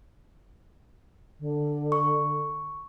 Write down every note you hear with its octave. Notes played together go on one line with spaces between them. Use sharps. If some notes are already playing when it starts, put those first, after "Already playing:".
D3
C#6